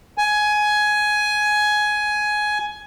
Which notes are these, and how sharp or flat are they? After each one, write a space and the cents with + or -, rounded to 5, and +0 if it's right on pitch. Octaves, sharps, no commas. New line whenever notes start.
G#5 +15